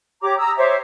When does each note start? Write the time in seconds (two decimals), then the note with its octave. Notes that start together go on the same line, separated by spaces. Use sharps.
0.22 G4 C#5 A#5 D6
0.38 A#5 D#6 E6
0.57 C5 C#5 E5 D6